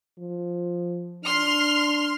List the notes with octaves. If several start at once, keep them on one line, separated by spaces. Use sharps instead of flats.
F3
D4 C6 F6